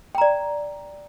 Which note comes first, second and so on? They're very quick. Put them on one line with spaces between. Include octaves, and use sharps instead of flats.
G5 A#5 D5